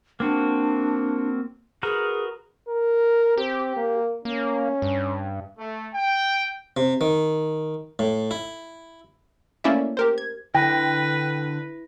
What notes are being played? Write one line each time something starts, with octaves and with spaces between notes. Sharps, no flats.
A#3 C4 D4 F#4
F#4 G#4 A#4 B4
A#4
C4 G4
A#3
A#3 C#4
G2
A3
G5
C3
D#3
A2
E4
A3 A#3 C#4 E4 D5 E5
G4 A#4 C5
G#6
D3 E4 B4 G5 A#6